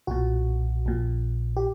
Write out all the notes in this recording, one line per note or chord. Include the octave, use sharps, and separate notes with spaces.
B1 A#2 F#4
A#1 A#2
G4